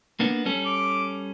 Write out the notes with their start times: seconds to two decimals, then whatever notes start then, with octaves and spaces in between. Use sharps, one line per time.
0.20 A#3 B3 D4
0.45 G3 C#4 A4
0.66 D6